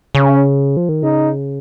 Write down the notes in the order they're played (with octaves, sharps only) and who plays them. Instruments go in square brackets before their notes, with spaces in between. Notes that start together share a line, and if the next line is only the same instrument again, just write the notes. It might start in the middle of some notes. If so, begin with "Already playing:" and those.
[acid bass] C#3 [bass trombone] C#4
[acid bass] F3
D#3
[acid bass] C#3 [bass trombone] D#4